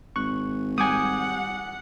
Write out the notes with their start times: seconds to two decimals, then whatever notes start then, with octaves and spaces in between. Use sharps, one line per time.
0.16 G#1 C#6 F#6
0.78 G3 F#5 G#5 D6 D#6